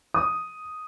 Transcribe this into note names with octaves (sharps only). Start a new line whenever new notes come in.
D#6